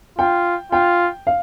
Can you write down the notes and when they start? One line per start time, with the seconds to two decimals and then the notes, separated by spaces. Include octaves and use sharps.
0.18 F4 G5
0.72 F4 G5
1.27 F5